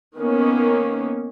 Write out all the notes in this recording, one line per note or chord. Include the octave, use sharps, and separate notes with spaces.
D#3 A#3 B3 C#4